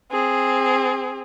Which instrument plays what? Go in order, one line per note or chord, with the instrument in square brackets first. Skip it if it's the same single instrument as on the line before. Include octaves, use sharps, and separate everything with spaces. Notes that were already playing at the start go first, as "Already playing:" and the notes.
[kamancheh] C4 G#4